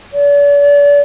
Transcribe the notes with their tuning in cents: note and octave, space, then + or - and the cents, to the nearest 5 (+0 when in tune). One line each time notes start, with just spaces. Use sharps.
D5 -40